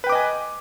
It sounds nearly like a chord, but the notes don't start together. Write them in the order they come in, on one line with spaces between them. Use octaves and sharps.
B4 G5 D6 D#5 G#5